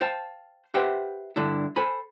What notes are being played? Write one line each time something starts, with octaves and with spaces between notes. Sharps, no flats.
C5 F5 G5 A5
G4 B4 C5 E5 F#5 G5
G2 D3 D4 E4
A4 C5 G#5 B5